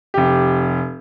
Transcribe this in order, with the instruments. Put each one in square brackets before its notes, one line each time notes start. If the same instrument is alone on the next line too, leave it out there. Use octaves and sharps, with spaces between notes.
[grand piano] F1 G4